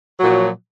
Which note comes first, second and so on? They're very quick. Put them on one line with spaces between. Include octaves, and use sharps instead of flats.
F#3 A#2 F3